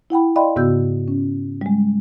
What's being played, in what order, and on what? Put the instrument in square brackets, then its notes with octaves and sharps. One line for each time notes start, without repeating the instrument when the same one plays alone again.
[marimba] E4 F#5 G5 B5
D5 D#5 F5 G5 B5 C6
G#2 C#3 B3 F#4 E6 G6
C#4
G3 G#3